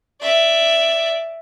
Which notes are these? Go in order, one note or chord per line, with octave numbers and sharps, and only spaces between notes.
D5 E5